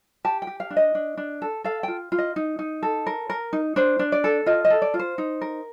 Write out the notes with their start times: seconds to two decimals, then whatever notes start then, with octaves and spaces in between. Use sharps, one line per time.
0.25 G4 A5
0.42 G5
0.47 G4
0.60 F5
0.70 D4
0.77 D#5
0.95 D4
1.17 D4
1.42 A4
1.64 A4 F5
1.83 F4 G5
2.12 F4
2.18 D#5
2.36 D#4
2.59 D#4
2.83 A4
3.07 A#4
3.30 A#4
3.53 D#4
3.76 D4 C5
3.99 D4
4.12 D5
4.24 A4
4.46 F4 D#5
4.65 D#5
4.70 A4
4.82 D5
4.94 F4
4.99 C5
5.18 D#4
5.41 A#4